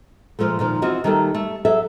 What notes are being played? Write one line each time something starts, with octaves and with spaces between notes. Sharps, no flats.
A#2 F3 G#3 A3
A#2 D#3 F3
E3 C4 F4 F#4 D#5
D#3 G3 A3 A#3 F#4 A4
A3
F#3 G#4 A4 E5